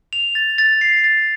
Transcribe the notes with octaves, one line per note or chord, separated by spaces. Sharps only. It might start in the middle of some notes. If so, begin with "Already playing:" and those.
F7
A6
A6
C7
A6